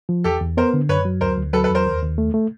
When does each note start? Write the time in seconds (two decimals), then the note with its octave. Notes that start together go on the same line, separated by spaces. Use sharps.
0.09 F3
0.24 E2 G4 A4
0.41 E2
0.57 B3 A#4 C5
0.74 D3
0.89 F#2 B4 C#5
1.05 F#3
1.21 D2 A#4 C5
1.37 D2
1.53 F#3 A4 B4
1.64 A4 B4
1.69 E2
1.75 A#4 C5
1.86 D#2
2.02 D#2
2.18 A3
2.34 A3